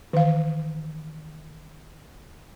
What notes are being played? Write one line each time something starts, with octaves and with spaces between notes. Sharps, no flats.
D#3 E3 F5